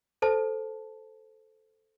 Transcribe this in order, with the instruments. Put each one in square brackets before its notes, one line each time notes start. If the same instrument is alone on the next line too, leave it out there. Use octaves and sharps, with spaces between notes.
[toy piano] A4 C5 A5